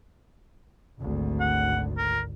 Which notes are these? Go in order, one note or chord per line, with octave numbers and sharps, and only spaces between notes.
G#1 D2
F#5
A#4